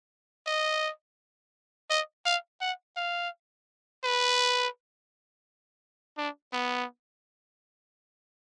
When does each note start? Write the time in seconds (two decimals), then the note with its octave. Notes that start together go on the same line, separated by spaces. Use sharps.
0.47 D#5
1.90 D#5
2.26 F5
2.61 F#5
2.96 F5
4.04 B4
6.18 D4
6.53 B3